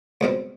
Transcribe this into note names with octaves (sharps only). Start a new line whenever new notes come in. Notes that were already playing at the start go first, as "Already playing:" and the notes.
C#2 B2 G3 C4